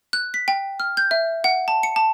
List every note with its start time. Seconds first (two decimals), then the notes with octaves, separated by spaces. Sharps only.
0.13 F#6
0.34 B6
0.48 G5
0.80 F6
0.97 G6
1.11 E5
1.44 F#5
1.68 A5
1.83 C#7
1.96 A5